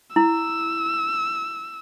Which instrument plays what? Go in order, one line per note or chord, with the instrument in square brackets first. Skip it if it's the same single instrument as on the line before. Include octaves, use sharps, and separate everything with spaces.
[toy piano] E4 [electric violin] E6